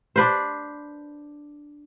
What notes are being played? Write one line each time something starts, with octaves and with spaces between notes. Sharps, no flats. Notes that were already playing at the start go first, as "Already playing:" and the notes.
D4 B4 C5